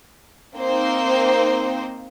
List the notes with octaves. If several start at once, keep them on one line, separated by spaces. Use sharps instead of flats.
A#3 C4 D#4 C5